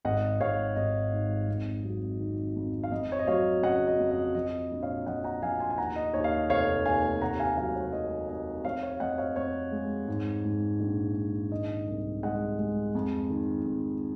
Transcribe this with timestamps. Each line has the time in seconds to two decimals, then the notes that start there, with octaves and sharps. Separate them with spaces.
0.05 G#1 D#5 F#5
0.40 G#1 C#5 F5
0.76 G#1 D#5
1.13 G#2
1.48 F2
1.84 F#3
2.20 D#3
2.56 F2
2.83 F5
2.91 F2 D#5
3.12 C#5
3.19 D#5
3.27 F#3 C#5 F5
3.63 C#3 D#5 F#5
3.87 D#5
4.00 F2
4.11 D#5
4.35 F3 D#5
4.71 A#1
4.82 C#5 F5
5.07 F3 D#5 F#5
5.24 F#5 A#5
5.42 F3 F5 G#5
5.60 G#5 C6
5.70 G#5
5.78 D#2 F#5 A#5
5.96 D#5
6.13 D#2 C#5
6.24 F5
6.32 D#5
6.50 F1 C#5 F5
6.85 D#2 F5 G#5
7.22 C3 F#5 A#5
7.40 F5 G#5
7.57 F#3 F5 G#5
7.75 C#5 F5
7.93 F#3 D#5
8.29 F2 D#5
8.65 F2 C#5 F5
8.82 C#5 F5
9.00 F2 D#5 F#5
9.18 C#5 F5
9.36 F2 C#5
9.72 G#3
10.08 G#2
10.44 G#2
10.80 A#1
11.16 G#2
11.52 D#3 D#5
11.87 C2
12.23 G#3 D#5 F#5
12.59 G#3
12.95 F2
13.30 D#3
13.66 F2